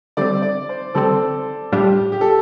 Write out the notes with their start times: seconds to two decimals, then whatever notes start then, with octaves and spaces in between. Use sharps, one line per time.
0.17 D3 G3 C4 D5
0.42 D5
0.69 C5
0.95 D3 G3 C4 A4
1.72 A2 G3 D4 F4 G4
2.12 G4
2.21 A4